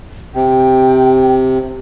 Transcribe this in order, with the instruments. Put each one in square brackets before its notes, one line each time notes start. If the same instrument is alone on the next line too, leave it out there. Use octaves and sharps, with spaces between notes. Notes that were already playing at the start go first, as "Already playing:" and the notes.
[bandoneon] C3 [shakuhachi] G5